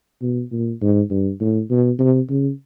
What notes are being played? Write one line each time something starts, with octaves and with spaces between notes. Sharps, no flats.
B2
A#2
G#2
G2
A2
B2
C3
C#3